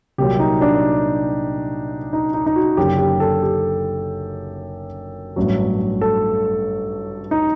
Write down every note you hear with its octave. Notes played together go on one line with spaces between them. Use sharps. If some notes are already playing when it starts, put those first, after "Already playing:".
C2 A#2 F#3 G4
D#4
D4
D#4
D#4
D#4
F#4
F#1 F#2 D3 F#3 G4
G4
A4
G4
A1 G2 F#3
A4
D#4